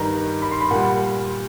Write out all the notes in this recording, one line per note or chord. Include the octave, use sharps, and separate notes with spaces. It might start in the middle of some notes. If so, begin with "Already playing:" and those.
Already playing: G2 D#3 G3 A#5
B5
C6
B5
A#2 G3 F#5